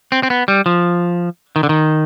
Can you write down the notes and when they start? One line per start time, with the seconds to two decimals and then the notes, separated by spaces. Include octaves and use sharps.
0.12 C4
0.23 C4
0.30 B3
0.48 G3
0.66 F3
1.56 D#3
1.63 D3
1.69 D#3